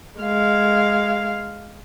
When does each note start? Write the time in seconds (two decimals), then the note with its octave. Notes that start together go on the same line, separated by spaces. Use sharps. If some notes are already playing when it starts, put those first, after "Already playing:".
0.20 G#3 F5